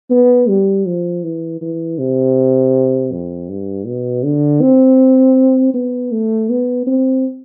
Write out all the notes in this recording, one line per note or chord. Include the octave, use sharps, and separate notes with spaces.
B3
G3
F3
E3
E3
C3
F2
G2
B2
D3
C4
B3
A3
B3
C4